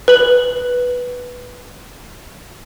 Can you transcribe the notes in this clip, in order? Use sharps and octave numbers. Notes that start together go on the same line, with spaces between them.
B4 F#7